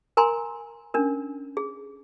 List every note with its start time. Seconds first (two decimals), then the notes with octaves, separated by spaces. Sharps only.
0.17 A#4 G#5 A#5 C6
0.94 C#4 D4 A#4
1.57 G#4